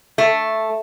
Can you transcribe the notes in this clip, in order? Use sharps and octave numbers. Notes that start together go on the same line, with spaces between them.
A3